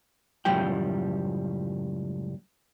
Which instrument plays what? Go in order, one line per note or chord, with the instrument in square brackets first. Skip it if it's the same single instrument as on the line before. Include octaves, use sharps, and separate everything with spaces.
[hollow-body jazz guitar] C#2 F#2 A2 F3 G3 G5